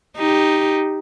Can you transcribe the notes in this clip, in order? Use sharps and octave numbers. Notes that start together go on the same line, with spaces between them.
D#4 G4